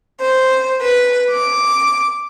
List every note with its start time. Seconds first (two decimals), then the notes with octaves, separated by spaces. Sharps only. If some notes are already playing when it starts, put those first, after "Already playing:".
0.21 C5
0.83 B4
1.32 D6